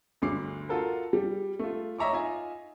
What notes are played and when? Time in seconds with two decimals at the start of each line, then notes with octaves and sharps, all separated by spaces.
0.22 G1 D2 D6 C7
0.69 F4 F#4 A4 A#4
1.13 G3
1.59 A3 F4
1.99 C#5 D#5 E5 A#5 C#6 D6
2.13 D#4 F4 D#5 E5 G#5